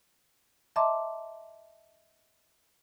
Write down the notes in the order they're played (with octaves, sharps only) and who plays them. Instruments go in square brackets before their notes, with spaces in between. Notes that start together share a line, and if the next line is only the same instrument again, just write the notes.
[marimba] D#5 E5 A5 A#5 C6 D6